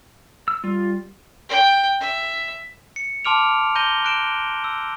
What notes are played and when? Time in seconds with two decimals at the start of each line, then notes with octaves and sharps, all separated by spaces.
0.48 E6
0.64 G3 F4
1.49 G5
2.00 E5
2.96 C#7
3.25 A5 C6 D6 F6 D7 F7
3.75 A#5 G6 A#6 D#7 G7
4.05 F#6 D7 E7
4.64 E6